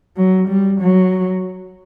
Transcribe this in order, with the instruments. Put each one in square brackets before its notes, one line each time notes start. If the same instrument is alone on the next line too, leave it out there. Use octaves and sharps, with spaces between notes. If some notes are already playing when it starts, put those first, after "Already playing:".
[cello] F#3
G3
F#3